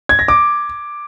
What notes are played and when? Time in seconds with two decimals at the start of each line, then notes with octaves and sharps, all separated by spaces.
0.09 G#6
0.19 A#6
0.28 D6